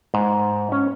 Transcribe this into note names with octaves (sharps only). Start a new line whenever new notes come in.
G#2
C#4